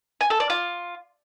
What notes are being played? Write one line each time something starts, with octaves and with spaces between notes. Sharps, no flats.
G#5
A4
D5
F4